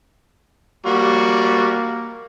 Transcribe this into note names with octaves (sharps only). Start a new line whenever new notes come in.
G3 A#3 F#4